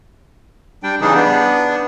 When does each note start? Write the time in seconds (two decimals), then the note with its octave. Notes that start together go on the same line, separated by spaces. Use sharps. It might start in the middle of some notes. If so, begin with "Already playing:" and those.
0.83 G3 D4 G5
1.01 C#3 E3 G3 D4 D#4 G#4
1.14 B3 D4